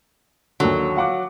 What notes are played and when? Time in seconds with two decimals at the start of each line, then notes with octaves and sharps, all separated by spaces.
0.60 D#2 D3 F#3
0.96 F5 F#5 D6